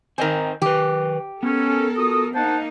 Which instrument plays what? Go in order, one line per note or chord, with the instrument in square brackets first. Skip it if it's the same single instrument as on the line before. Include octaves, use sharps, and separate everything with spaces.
[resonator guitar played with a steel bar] D#3 C4 [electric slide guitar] A#4 D#5 G#5
[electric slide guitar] D#3 B4 [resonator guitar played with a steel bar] G4
[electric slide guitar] B3 [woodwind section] C#4 [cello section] A4 A#4
[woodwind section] F4 F#4 D#6
[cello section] A#3 D#4 [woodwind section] C5 F#5 A5